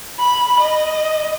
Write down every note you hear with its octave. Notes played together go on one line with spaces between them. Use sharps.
B5
D#5